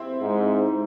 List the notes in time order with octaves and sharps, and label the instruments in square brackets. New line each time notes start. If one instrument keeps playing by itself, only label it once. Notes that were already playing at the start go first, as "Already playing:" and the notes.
Already playing: [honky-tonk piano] C4 E4
[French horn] G#2